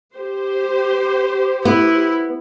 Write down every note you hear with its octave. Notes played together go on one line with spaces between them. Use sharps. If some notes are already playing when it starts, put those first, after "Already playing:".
G4 C5
B3 E4